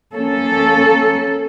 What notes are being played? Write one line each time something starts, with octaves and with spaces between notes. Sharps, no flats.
A#3 C#4 A4